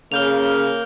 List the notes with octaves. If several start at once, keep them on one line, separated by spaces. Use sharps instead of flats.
C#3 A#3 A#4 F6 G6 F7